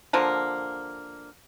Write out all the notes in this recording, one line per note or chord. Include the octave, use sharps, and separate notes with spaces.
D3 F3 A#3